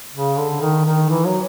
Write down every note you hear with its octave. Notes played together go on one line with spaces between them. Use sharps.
C#3
D3
D#3
D#3
E3
F#3